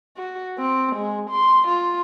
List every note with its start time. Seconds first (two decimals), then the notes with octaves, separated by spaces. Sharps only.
0.17 F#4
0.58 C4
0.96 G#3
1.30 C6
1.68 F4